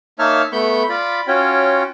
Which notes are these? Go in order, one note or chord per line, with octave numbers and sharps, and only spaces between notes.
A#3 D#4 C#5 E5 A5 F6
A3 B3 B5 C#6 G6
F4 D5 B5
C#4 F4 F#4 C#5 G5